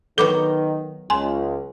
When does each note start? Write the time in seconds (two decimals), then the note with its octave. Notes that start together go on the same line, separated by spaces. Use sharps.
0.18 D#3 F#3 B3 F#4 A4 D6
1.10 C#2 G#5 C6